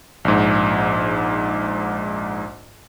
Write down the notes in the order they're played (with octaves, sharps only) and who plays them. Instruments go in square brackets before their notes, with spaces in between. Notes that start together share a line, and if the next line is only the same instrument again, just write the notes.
[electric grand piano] A#1 G#2